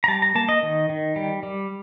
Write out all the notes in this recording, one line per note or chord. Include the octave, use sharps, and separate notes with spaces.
A#5
G3 A5
A#5
A#3 A5
D#5
D#3
D#3
G3
G3